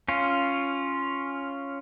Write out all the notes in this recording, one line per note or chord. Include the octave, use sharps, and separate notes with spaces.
C#4 F4